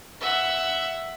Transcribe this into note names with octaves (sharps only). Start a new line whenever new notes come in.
E5 F#5